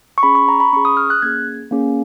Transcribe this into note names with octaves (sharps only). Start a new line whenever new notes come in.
C#6
C#4 G#4 B5
C#6
A#5
B5
C#4 G#4 C#6
D#6
F6
F#6
A#3 C#4 G#4 G#6
A#3 C#4 G#4